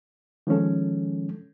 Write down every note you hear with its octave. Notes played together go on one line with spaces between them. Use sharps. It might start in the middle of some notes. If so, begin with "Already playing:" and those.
D#3 F3 G#3 C#4 A4